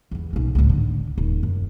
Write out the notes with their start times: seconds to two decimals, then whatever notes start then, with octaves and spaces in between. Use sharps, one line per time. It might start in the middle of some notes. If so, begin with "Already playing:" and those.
0.11 E2 E3
0.33 B1 C#4
0.55 C#2 A2
0.69 D3
1.18 D#1
1.43 F#2